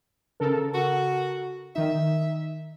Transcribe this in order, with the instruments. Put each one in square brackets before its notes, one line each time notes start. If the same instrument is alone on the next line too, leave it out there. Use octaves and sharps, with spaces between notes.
[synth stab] C#3 A4 A#4
[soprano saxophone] F#4
[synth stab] D#3 D#4 [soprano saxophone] E5